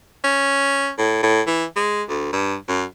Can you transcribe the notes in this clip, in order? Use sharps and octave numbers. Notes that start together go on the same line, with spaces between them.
C#4
A2
A2
E3
G#3
D2
G2
F#2